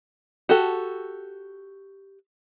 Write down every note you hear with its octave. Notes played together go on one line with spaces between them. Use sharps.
F#4 G4 A4